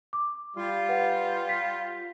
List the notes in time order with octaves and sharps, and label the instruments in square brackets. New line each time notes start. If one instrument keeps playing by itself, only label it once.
[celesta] D6
[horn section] G3 F4
[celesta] B4 F#5
B6